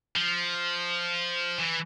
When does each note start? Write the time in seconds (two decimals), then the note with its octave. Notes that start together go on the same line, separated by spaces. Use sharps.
0.16 F3
1.58 E3